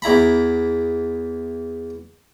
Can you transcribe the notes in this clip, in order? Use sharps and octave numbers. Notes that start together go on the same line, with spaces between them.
E2 E4 A#5 B5